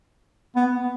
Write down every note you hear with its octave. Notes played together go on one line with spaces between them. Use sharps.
B3